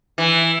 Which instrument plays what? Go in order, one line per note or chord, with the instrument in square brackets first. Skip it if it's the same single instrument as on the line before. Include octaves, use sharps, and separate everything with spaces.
[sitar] E3